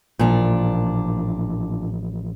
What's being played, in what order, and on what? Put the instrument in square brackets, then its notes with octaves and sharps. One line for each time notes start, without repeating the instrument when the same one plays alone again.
[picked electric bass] A1 F3 [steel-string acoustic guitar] A#2 D4